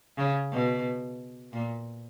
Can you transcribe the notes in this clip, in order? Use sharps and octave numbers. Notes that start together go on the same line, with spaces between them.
C#3
B2
A#2